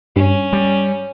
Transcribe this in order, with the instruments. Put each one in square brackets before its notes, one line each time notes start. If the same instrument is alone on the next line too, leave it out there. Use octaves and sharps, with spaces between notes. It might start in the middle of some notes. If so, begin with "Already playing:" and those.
[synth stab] G2 [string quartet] C#4
[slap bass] G3